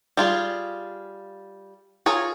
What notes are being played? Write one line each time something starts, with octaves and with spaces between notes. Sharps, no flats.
G3 F4 G#4
F4 G#4 A#4 C#5